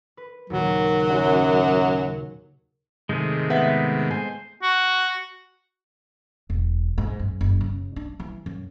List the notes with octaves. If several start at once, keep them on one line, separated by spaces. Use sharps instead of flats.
B4
D#2 A#2 C#3 F#3
F#2
G#2 C3 D#3 G#3 A3 G#4
B3 E5
C5 G#5
F#4
E1
G#2
F#2
F#1
C#3
D4
E3
F#2